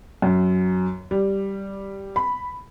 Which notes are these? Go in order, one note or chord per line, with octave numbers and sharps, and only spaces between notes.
F#2
G3
B5